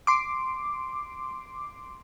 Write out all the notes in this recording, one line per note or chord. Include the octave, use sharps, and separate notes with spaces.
C6 D6